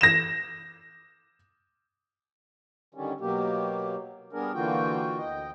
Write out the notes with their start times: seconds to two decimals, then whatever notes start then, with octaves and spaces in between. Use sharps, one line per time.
0.01 A#6 E7
2.94 D3 D#3 G3 C#4
3.20 B2 F#3 A#3 G4
4.33 G3 B3 D4 G#4 A#4
4.54 D3 E3 A#3 F4 F#4 G5
5.18 D2 D#5 G5